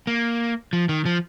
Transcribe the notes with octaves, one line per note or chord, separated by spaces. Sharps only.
A#3
F3
D#3
F3